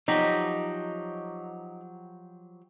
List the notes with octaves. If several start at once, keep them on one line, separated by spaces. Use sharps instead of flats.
F3 F#3 D#4 G4